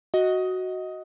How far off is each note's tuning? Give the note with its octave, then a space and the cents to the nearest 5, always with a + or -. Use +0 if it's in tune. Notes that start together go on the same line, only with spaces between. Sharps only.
F#4 +0 D#5 +15